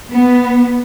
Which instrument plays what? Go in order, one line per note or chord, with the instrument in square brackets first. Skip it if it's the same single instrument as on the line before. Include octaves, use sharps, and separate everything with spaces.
[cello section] B3